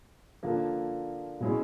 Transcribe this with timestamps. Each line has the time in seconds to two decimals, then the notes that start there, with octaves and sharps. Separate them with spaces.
0.43 D3 F3 A#3
1.40 B2 G#3 C#4 E4